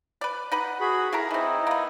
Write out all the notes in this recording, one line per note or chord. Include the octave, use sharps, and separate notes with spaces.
B4 D5
D#4 B4 F#5
F#4 G#4 B5
E4 A4 A#4 A#5
E3 C4 D#4 E4
A#3 B3